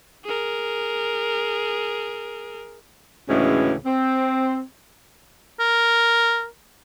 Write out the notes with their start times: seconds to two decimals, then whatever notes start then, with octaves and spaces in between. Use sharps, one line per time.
0.25 G#4 A#4
3.28 D2 A2 C#3 E3 G#3 C#4
3.85 C4
5.60 A#4